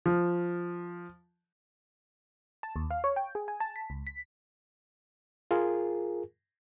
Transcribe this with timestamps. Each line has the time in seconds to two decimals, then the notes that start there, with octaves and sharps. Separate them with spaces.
0.06 F3
2.63 A5
2.76 D#2
2.91 F5
3.04 C#5
3.16 G5
3.35 G#4
3.48 G#5
3.60 A5
3.76 B6
3.90 C#2
4.07 B6
5.51 F4 G#4 A#4